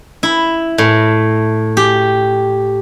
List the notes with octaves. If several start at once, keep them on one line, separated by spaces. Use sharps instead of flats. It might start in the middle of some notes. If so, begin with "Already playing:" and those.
E4
A2
G4